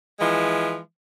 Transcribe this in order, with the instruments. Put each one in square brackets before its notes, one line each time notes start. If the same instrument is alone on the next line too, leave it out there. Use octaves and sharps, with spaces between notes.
[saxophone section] E3 F3 G#3